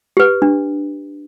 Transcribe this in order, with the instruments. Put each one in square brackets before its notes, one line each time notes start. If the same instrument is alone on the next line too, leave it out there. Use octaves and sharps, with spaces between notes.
[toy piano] G4 B4
D4